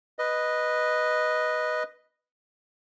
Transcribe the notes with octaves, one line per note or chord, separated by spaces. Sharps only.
B4 D#5